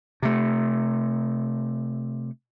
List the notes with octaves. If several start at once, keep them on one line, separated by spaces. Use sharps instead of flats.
C3 A3